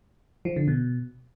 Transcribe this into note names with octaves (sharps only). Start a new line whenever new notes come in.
F3
D3
B2